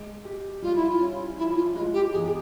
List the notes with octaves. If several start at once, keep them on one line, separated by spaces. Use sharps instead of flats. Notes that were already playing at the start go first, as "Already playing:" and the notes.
Already playing: G#3
G4
G3 F4
E4
F4
C#4
F3 E4
F4
G#3 F4
G4
E2 G#4